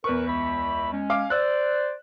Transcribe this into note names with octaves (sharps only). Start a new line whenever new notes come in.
E2 A#4 B4 C#6
C#2 E5 B5
G#3 C#4
F5 D6
C5 D5 E6 F#6